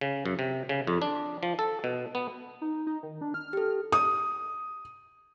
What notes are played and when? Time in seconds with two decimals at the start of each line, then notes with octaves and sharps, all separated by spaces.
0.01 C#3
0.26 F#2
0.39 C3
0.69 C#3
0.87 F2
1.02 D4
1.43 F3
1.59 A4
1.84 B2
2.15 B3
2.62 D#4
2.87 D#4
3.03 D#3
3.21 D4
3.34 F6
3.53 G4 A4
3.92 D#6